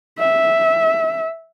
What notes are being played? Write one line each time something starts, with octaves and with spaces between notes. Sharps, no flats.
E5